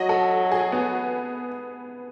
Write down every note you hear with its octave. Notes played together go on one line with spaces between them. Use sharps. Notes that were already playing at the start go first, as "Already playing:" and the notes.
Already playing: F#3 D#5
A4
G#4
B3